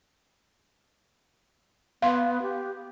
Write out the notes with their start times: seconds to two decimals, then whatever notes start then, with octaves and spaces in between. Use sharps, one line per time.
2.02 B3 F5 C6
2.42 G4